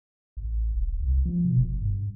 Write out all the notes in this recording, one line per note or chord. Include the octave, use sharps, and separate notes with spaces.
A1
D#1
C2
F3
B2
E1
F#1
G2